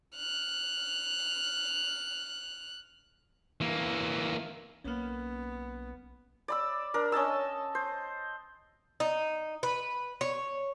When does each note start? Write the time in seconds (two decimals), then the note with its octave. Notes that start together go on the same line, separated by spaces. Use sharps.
0.16 F6 F#6
3.61 E3 A#3
4.84 B1 A#3 B3 C#4
6.48 D5 B5 E6
6.94 D4 A#4
7.12 C#4 D#5 A5 E6
7.75 C5
9.00 D#4
9.63 B4
10.21 C#5